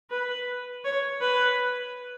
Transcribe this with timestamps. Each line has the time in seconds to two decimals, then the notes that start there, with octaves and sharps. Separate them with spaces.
0.10 B4
0.85 C#5
1.21 B4